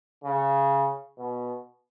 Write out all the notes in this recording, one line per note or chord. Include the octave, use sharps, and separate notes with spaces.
C#3
B2